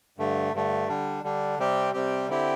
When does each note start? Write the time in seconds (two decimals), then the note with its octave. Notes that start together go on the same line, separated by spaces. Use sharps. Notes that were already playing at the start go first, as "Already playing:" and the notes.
0.18 G2 D3 A3
0.53 G2 D3 A3
0.88 D3 G3 D4
1.24 D3 G3 D4
1.59 C3 G3 C4 G4
1.94 C3 G3 C4 G4
2.29 D3 C4 E4 G4